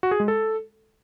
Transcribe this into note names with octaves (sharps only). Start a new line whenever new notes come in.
F#4
G#4
G#3
A4